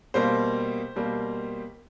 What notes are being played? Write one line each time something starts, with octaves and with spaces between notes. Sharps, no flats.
B2 G3 A#3 C5
B2 G3 A#3